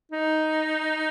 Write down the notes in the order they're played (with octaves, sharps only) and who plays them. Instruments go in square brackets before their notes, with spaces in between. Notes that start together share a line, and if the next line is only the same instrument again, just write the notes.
[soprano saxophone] D#4